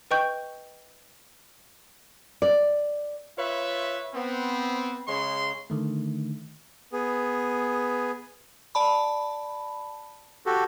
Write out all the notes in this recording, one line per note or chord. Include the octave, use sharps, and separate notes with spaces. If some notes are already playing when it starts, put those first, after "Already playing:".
B4 D#5 G5 C#6 G6
D5
F4 B4 C#5 E5
B3 C4
C#3 G#3 C#5 C6
D3 D#3 A3
B3 G#4
D5 A5 B5
F#4 G4 A4